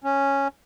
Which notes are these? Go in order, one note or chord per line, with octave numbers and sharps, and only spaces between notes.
C#4